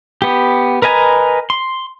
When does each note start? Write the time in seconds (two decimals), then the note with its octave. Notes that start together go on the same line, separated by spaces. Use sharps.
0.22 B3 G4
0.82 A#4 B4 D#5 G#5 A#5
1.50 C6